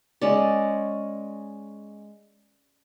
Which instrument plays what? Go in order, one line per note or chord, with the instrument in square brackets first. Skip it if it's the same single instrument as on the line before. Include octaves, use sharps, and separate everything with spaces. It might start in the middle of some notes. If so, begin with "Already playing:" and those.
[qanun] G#3 C#4 D5